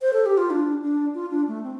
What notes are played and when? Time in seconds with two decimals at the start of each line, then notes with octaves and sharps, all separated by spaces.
0.01 C5
0.13 A4
0.26 G4
0.37 F4
0.50 D4
0.83 D4
1.15 F4
1.30 D4
1.48 A3
1.63 C4